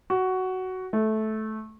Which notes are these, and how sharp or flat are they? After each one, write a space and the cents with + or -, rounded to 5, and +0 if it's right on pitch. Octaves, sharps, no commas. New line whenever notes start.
F#4 +10
A3 -15